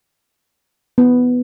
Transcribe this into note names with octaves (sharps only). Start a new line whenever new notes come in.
B3